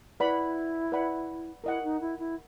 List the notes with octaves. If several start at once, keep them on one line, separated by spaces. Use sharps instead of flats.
E4 B4 D5 F#5 B5
B4 D5 F#5 B5
E4 A#4 D#5 F#5
D#4
E4
E4